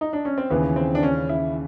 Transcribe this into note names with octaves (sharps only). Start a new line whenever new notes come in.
D#4
D4
C#4
C4
D#2 C#3 E3 B3
C4
D4
C#4
E4